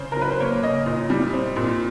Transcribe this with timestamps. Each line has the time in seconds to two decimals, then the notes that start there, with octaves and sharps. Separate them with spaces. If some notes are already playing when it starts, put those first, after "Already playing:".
Already playing: C#3 C5
0.12 A#4
0.16 F#3 B4
0.31 C5
0.40 A#3 C#5
0.63 C#3 D#5
0.86 A#2
1.10 G3
1.33 C4
1.56 A#2